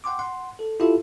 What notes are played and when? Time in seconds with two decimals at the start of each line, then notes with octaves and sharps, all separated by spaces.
0.04 F#5 G5 C6 D6
0.19 F#5 C6
0.59 A4
0.80 E4 F4 G4 A4 E5